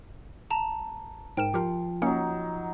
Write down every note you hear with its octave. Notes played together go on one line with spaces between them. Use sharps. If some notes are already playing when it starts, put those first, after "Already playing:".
A5 A#5
G#2 A#4 G5 E7
F3 G4 A#4
F#3 A#3 C#4 D#4 C#7